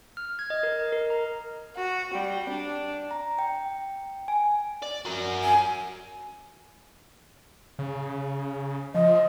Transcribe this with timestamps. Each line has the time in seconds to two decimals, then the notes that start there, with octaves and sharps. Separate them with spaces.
0.17 F6
0.39 G#6
0.50 D#5
0.63 A#4
0.79 D#5
0.92 A#4
1.10 A#5
1.77 F#4
2.15 G3
2.50 D4
3.11 A#5
3.39 G5
4.28 G#5
4.83 D5
5.05 F#4 A#4
5.44 G#5
7.79 C#3
8.95 F3 D#5